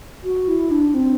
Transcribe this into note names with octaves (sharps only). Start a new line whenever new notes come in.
F#4
E4
D4
C4